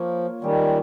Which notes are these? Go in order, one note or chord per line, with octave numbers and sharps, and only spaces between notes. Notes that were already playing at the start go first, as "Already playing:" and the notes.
Already playing: F3 A#3 F4 A#4 C#5
A#2 D#3 G3 G#3 C#4 G4